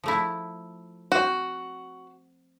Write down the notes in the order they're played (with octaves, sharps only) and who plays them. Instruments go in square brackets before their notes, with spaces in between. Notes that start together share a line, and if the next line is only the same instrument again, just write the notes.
[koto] F3 A3 E4
[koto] C4 [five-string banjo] F#4